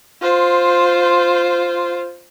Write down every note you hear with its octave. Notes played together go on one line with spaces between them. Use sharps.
F4 C5